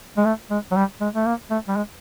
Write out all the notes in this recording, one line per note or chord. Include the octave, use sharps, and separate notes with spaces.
G#3
A3
G#3
F#3
G3
G#3
A3
A#3
A3
G3
G#3